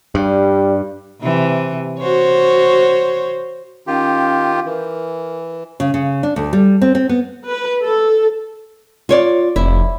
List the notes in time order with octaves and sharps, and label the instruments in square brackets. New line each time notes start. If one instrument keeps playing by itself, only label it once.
[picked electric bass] G2 [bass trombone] G3
[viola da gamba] C3 E3
F#4 C5 C#5
[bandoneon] D#3 F4 G4 [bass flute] C#4
[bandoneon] E3 [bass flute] A#4
[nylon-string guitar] C#3
C#3
D4
D2
G3
C4
C4
B3
[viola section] B4
A4
[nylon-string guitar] F4 C#5 D5
[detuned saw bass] F1 [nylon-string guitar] E4